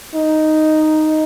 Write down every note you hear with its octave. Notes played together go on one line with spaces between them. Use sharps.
D#4